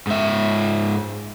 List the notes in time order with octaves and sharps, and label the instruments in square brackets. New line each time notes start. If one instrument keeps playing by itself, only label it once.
[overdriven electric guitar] G#2 E5